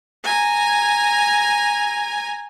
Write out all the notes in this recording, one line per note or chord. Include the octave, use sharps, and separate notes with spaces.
G#5 A#5